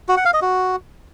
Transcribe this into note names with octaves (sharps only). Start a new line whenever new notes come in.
F#4
F#5
F5
D#5
F#4